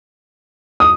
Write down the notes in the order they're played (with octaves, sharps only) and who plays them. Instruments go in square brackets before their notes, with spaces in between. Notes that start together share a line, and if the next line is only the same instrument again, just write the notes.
[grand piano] D#6